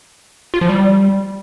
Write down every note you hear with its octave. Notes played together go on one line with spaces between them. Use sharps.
F4
F3
G3